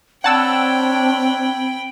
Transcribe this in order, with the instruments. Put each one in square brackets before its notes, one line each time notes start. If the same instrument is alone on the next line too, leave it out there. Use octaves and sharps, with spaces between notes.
[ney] C4 [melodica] D4 C#5 [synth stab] F#5 A5 E6 [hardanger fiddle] G5 B5